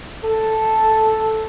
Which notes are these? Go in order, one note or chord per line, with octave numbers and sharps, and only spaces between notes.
A4